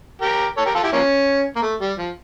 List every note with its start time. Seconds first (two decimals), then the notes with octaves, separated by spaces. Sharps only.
0.22 G4 A#4
0.58 A4 C#5
0.66 G4 A#4
0.75 F4 A4
0.83 E4 G4
0.93 F3 A#3 C#4
1.56 A#3
1.62 A3
1.80 G3
1.98 F3